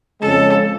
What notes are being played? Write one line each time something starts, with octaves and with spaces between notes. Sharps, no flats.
F2 C#3 G#3 A4